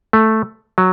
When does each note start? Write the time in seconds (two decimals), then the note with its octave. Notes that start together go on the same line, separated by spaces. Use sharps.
0.13 A3
0.78 F#3